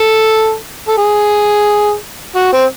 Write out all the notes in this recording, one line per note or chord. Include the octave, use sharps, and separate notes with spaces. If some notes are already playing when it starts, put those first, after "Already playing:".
Already playing: A4
A4
G#4
F#4
C4